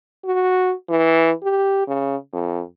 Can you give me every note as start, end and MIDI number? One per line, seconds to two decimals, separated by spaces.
0.25 0.73 66
0.89 1.32 52
1.43 1.83 67
1.88 2.16 49
2.33 2.62 41